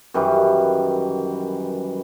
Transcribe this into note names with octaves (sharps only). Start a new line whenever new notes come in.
F#2 D#3 E3 G3